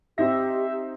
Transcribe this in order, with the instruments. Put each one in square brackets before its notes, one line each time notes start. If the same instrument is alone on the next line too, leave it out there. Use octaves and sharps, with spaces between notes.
[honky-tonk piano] C4 D#4 A#6 [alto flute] G4 [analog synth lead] E5